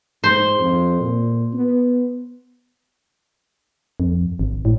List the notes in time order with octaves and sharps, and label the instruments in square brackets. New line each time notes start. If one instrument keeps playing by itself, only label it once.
[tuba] G#2 [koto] C5
[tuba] F2
A#2
B3
[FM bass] F2
G#1
A2